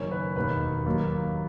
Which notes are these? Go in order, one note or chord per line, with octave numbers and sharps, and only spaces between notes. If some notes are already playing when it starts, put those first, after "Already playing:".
Already playing: F#1 F#2 D#3 C#5
B4
E1 D#2 D#3 B4
D#2 D#3 F#3 A#3